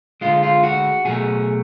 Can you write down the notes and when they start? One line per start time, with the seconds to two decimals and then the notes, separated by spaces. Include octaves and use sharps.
0.21 D3 G#3 F4
0.43 F4
0.63 F#4
1.05 B2 F#3 A3 G#4